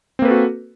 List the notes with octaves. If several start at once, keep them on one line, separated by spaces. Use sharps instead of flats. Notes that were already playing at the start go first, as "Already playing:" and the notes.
A#3 C4 F#4 A4 B4